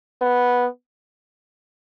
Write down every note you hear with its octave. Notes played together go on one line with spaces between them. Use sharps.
B3